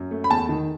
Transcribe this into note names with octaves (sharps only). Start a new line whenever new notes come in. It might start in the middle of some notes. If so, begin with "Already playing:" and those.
Already playing: F#2
A3
B5
E2 A5
D#3